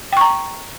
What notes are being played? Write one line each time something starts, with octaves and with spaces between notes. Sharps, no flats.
G5 A#5 C#6